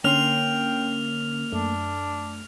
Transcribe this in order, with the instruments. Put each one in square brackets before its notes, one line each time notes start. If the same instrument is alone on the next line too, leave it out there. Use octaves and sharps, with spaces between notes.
[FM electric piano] D3 C#4 [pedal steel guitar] A#3 C6 [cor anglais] G5 [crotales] F6 F7
[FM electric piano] F#2 A3 [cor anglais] D4